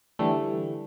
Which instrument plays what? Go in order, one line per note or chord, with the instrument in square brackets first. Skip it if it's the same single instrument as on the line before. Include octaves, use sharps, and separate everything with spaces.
[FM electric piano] D3 E3 G3 A3